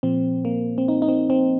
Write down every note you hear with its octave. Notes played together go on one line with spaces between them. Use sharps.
A#2 F3 C4
A#3
C4
D#4
D#4
C4
C4